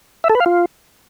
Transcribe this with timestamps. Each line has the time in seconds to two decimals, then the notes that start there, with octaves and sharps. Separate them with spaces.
0.24 E5
0.29 A4
0.35 B4
0.40 F5
0.46 F4